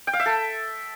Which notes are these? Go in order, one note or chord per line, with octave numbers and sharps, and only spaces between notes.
G5
F5
E5
A4